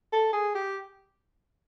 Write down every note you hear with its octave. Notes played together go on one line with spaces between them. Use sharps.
A4
G#4
G4